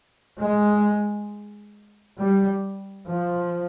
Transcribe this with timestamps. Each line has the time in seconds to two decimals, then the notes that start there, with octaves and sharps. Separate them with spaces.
0.39 G#3
2.19 G3
3.09 F3